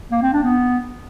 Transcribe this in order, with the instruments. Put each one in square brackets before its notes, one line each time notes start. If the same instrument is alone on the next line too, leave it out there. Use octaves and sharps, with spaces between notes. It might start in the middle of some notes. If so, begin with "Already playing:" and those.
[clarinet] A#3
C4
D4
B3